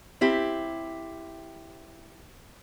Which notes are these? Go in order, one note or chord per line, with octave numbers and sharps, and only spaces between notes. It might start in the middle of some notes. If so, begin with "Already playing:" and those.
C4 E4 G4